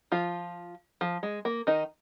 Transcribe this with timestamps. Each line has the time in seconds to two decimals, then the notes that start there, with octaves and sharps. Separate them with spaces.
0.12 F3 F4
1.01 F3
1.23 G#3
1.45 A#3
1.67 D#3 D#4